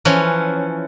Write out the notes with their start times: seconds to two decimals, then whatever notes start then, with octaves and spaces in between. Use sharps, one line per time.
0.05 E3 F3 C#4